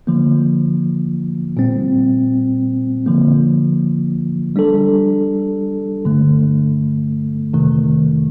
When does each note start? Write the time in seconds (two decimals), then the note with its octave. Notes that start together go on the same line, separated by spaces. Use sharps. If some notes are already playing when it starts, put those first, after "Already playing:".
0.07 D3 F3 A#3
1.57 A#2 G3 C4
3.06 D3 F3 A#3
4.56 G3 D4 A4
6.05 G2 D3 A3
7.53 F2 C3 D#3 A3